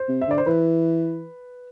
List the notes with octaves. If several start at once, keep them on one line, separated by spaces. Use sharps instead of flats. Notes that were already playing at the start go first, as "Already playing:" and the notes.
Already playing: C5
C3
E5
D3 D5
C5
E3 B4